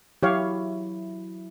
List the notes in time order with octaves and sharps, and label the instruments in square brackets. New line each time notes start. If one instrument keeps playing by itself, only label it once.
[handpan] F#3 E4 [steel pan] G4 C#5 F5